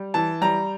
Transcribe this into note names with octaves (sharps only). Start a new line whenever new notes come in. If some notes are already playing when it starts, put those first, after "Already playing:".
Already playing: G3
E3 A5
G3 A#5